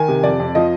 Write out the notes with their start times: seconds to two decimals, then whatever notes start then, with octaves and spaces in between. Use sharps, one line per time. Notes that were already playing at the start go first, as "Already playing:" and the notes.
Already playing: D#3 G#5
0.08 C3
0.24 F2 D5
0.40 F2
0.55 F3 D#5